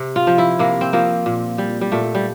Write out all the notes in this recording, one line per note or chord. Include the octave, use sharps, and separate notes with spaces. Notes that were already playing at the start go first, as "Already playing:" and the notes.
Already playing: C3
F4
F3
E4
C3 A#3
C4
F3 A#3
A#2
G3
G3
A#2 A3
G3